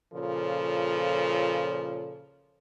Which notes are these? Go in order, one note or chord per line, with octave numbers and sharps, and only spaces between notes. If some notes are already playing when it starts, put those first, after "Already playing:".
A#2 C#3 F3 A4 C#5